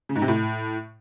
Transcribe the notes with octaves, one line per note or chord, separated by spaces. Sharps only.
C#3
G#2
C3
A2